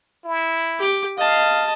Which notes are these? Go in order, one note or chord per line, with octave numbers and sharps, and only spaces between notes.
E4
G4 D6
D#5 F5 A5